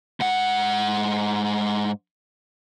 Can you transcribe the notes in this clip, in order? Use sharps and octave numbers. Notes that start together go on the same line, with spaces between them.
G#2 F#5